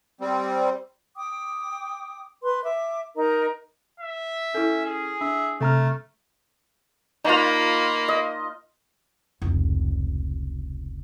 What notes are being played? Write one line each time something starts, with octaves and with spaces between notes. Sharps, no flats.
G3 C4
G5 D6 D#6
B4 C6
E5 D6
D#4 A#4 D#5 A#5
E5
C#4 E4 A4
G#4
D4 E5
C3 A3 A4 A#5 F6
A#3 D#4 F4 B5
D#5
F1 C#2